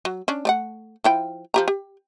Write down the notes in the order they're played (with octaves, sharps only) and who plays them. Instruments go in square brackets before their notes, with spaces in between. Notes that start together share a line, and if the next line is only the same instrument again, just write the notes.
[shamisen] F#3
C#4 D4
A3 D5 F#5
F3 E4 G5
F3 G4 A#5
G4